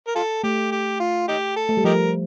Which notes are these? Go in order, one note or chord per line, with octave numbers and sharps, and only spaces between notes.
A#4
F4 A4
A3 G4
G4
F4
D#4 G4
A4
A3
G3
F3 D#4 G4 A#4